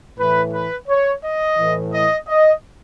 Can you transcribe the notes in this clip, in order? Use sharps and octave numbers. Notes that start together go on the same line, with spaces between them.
A2 E3 B4
B4
C#5
D#5
A2 E3
D#5
D#5